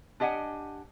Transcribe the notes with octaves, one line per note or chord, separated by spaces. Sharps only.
D4 G4 D#5 F#5 G#5